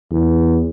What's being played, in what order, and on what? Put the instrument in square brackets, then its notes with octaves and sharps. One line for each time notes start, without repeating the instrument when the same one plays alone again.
[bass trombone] E2